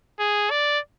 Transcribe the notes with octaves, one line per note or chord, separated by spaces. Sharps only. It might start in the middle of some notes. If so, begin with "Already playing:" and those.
G#4
D5